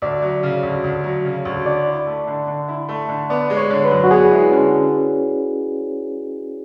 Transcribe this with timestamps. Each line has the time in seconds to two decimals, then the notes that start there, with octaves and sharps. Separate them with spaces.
0.02 D2 D5
0.22 F#3
0.43 C#3
0.63 D2
0.84 D2
1.04 F#3
1.25 C#3
1.45 D2
1.65 D3 D5
1.86 E4
2.07 A3
2.27 D3
2.47 D3
2.68 E4
2.89 A3
3.08 D3
3.30 B3 D5
3.50 G#3
3.57 C#5
3.70 D3
3.84 B4
3.91 F#2
4.04 F#4
4.11 B3 G#4
4.31 G#3 E4
4.52 D3 C#4